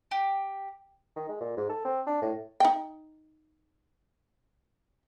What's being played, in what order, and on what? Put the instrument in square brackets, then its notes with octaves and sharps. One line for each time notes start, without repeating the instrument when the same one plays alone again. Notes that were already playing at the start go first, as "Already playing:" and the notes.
[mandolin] G4
[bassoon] D#3
G#3
A#2
G#2
A4
C4
D4
A2
[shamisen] D#4 G5